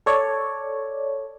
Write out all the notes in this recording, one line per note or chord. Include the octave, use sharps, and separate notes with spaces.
A4 C#5 D5